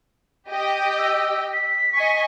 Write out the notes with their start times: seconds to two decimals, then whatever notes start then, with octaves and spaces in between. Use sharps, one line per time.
0.49 G4 D#5 G5
0.98 E6
1.53 B6
1.95 D#5 G#5 C#6